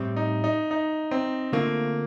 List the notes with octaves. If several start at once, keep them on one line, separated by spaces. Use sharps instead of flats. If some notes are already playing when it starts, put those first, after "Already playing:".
Already playing: A2 G3 C4
D#4
D#4
D#4
C4
D3 A3 A#3 C4 F4